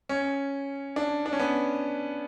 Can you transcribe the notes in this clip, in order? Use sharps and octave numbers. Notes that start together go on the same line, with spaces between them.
C#4
D4
D4
C#4
B3